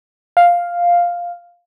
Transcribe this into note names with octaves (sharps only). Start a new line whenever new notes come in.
F5